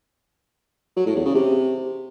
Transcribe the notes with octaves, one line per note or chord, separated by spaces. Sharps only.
F#3
A2
E2
C#3
C3